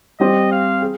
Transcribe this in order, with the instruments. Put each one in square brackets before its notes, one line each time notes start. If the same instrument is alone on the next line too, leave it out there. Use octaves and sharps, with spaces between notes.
[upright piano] G3 C4 G4 [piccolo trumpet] D#5
[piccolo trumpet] F5
[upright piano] G#4